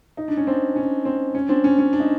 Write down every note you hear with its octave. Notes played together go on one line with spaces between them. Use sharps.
D#4
D4
C#4
C4 D4
C#4
C4
C#4
C4 D4
C#4
C#4
D4
D#4